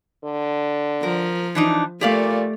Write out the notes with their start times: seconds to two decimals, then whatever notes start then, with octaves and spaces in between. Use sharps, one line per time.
0.24 D3
1.03 F3 A#4
1.55 E3 D4 D#4
2.01 A#2 A3 G4 D5 F5